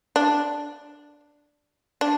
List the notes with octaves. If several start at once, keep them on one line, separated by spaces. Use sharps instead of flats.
D4
D4